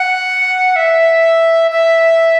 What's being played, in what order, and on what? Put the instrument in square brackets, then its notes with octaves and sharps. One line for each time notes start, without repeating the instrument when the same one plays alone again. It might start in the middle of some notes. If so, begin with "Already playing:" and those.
Already playing: [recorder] F#5
E5
E5